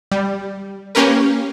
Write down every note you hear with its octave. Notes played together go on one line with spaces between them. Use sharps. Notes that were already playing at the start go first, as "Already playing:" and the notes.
G3
A#3 C#4 G4 A#4 B4